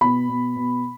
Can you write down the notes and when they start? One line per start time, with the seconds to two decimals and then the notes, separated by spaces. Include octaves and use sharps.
0.01 B2 B5
0.29 B2
0.56 B2